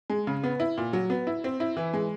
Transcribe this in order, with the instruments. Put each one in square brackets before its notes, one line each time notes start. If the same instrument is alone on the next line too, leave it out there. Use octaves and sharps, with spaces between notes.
[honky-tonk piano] G#3
C#3
B3
E4
A#2
F#3
B3
E4
C4
E4
E3
G#3